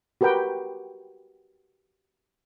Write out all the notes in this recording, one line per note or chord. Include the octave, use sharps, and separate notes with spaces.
F#4 G4 A#4 B4 G5